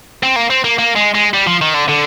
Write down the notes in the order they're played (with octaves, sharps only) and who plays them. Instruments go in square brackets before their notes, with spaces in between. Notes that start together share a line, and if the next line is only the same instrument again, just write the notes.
[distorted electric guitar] C4
A#3
C4
A#3
A#3
G#3
G#3
G3
F3
D#3
D3
D3